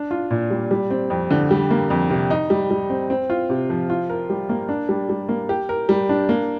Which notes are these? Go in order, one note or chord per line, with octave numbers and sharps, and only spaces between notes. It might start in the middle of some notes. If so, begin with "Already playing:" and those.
Already playing: D4
F4
A#2
G3
G3
C4
F2
D3
G3
A#3
F2
C3
D#4
G3
G3
C4
C4
F4
C3
F3
F4
A#4
G3
A#3
D4
G3
G3
A#3
G4
A#4
G3
D4
A#3